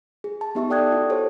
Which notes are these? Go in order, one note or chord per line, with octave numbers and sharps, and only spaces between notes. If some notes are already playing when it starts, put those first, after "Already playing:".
G#4
A5
B3 D#4 G4 E5 A5 C#6
A4 D5 G5 D#6 F#6 G#6
E4 F#4
G4 A4 C5 C#5